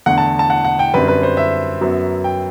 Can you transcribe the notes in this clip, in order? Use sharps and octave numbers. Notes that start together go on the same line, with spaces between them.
E2 D3 A3 F#5
A5
A5
F#5
F#5
G5
F#2 D3 G3 C4 B4
B4
C5
E5
F#2 F#3 B3
G5